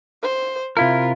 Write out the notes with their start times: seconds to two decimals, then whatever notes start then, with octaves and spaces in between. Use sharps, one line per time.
0.23 C5
0.77 C3 E4 F4 A#4